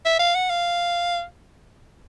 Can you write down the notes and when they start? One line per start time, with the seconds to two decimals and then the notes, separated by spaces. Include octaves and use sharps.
0.05 E5
0.19 F5
0.35 F#5
0.50 F5